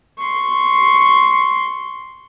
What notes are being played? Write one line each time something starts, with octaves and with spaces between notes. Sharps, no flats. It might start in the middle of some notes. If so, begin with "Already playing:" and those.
C6 C#6